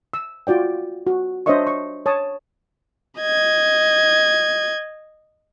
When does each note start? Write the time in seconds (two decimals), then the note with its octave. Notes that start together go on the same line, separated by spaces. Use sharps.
0.14 E6
0.47 F4 F#4 D5 G5
1.07 F#4
1.46 D4 C5 C#5 D#5 E5 C#6
1.67 C#6
2.06 C#5 A5 D#6
3.21 D#5 G#6